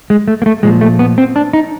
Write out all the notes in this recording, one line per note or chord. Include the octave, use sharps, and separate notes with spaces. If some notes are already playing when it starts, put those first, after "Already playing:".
G#3
A3
A#3
A3
A#2 F3 G#3
A3
B3
C4
D4
D#4